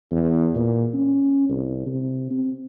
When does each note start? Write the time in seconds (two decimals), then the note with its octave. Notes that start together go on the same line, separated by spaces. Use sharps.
0.11 E2
0.55 A#2
0.94 C#4
1.49 C2
1.86 C3
2.31 C4